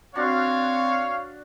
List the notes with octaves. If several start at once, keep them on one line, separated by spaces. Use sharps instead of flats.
C4 D4 F#4 C#5 F5